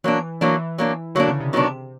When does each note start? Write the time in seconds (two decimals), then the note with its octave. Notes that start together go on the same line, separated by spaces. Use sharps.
0.04 E3 F#3 A#3 D4
0.41 E3 F#3 A#3 D4
0.78 F#3 A#3 D4
1.15 D3 F#3 A#3 D4
1.28 C#3
1.40 C3
1.53 D#3 F#3 B3 D4